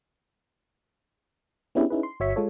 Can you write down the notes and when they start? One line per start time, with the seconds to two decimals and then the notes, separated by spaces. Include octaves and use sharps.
1.75 B3 C#4 D4 E4 G4 G#4
1.90 C#4 D#4 E4 G#4 B4
2.03 C6
2.20 G1 F#4 C#5 E5 C#6 B6
2.36 G#3 F4 A4 C#5